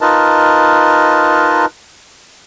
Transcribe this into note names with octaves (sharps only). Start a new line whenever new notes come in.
D#4 F4 A#4 B4 D#5 A5